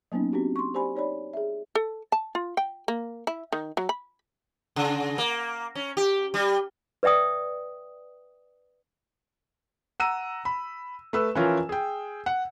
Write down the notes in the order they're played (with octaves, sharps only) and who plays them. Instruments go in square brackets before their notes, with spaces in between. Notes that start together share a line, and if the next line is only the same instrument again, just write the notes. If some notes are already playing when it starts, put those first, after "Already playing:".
[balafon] F#3 A#3 B3 C#4 D#4
C4 D4 F#4 G4
C6 C#6
G4 C5 D5 G#5 B5
D#4 C#5 D5 B5
G#4 E5
[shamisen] A4
A5
F4
G5
A#3
E4
D#3
F#3
B5
[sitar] C#3
A#3
C#4
G4
G3
[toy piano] B4 D5 E5 G5 D#6
[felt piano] F#5 A#5 E6 D#7
B5
A3 B4 E6
E3 F3 C#4 F4 A#4
G#4 G5
F#5